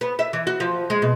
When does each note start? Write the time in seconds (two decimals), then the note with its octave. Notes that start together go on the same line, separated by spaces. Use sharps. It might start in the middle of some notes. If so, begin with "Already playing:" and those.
0.01 B3
0.19 E5
0.33 E3
0.47 F#4
0.60 F3
0.90 G#3
1.02 B2